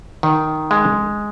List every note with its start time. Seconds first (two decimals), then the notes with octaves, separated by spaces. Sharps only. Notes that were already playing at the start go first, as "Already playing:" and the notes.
0.23 D#3
0.71 G#3